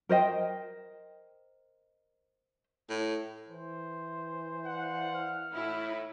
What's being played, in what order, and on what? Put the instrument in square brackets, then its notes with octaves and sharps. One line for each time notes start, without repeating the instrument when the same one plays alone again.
[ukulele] A#4 C5 D#5 G5
[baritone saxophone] A2
[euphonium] E3 [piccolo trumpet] C5
[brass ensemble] D5 F5 F#5
[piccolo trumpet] F6
[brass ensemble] A2 [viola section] E4